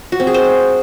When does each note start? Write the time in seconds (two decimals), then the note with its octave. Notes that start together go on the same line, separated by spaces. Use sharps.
0.12 F#4
0.20 C4
0.27 G#4
0.34 C5